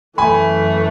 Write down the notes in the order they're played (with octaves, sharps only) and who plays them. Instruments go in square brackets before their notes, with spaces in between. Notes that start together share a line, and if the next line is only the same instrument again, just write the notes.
[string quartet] F#2 E3 A3 [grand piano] G#5 B5